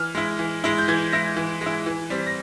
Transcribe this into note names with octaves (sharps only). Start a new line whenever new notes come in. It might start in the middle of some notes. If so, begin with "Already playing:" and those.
Already playing: E3 F6
G#3 E4
E3
G#3 E4
G6
E3 G#6
G#3 E4 A#6
E3
G#3
E4
E3
G3 C4
A#6